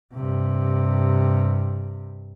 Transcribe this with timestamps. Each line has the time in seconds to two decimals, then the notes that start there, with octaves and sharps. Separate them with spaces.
0.14 G2 C3